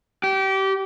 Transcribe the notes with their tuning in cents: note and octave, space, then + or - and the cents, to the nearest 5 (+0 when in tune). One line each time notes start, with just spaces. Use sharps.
G4 -25